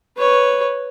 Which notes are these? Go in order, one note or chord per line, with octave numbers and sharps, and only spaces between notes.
B4 C#5